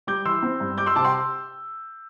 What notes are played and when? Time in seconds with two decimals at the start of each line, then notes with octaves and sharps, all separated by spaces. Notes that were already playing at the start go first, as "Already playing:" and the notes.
0.07 G3 D6 G6
0.25 E3 C6 E6
0.42 C4
0.60 G2
0.78 G3 D6 G6
0.86 C6 E6
0.95 C3 A5 D6
1.04 G5 C6